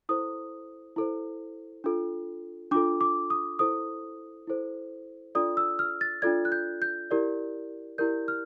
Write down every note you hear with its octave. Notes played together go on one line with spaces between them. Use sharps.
E4 A4 C5 D#6
E4 A4 C5
D4 F4 A4
D4 F4 A4 D6
D6
D#6
E4 A4 C5 D#6
E4 A4 C5
D4 F4 A4 D5 D#6
E6
F6
A6
D4 F4 A4 D5 G#6
F#6
G6
G6
E4 G4 A#4 D5
E4 G4 A#4 D5 G6
F6